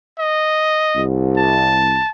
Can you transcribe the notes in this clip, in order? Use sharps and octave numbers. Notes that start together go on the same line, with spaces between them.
D#5
C2
A5